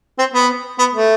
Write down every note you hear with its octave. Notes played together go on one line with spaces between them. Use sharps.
C4
B3
B3
A3